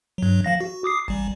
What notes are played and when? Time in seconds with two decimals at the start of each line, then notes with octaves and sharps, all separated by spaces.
0.18 G2 F#3
0.44 F3 F5 A#6
0.61 F#4
0.84 D6 D#6 C7
1.08 A1 G3